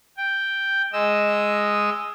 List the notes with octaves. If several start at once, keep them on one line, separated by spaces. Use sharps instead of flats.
G5
G#3 D#5 E6